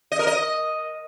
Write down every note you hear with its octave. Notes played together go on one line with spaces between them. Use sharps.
D#5
A#4
D#5